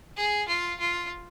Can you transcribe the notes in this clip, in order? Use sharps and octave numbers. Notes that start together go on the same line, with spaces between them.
G#4
F4
F4